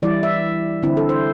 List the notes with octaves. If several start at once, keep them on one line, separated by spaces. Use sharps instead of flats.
E3 G3 E4 D5
E5
D3 C4 E4
A4
C5